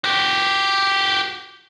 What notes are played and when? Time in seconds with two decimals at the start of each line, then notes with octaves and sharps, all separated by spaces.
0.04 F#4 G4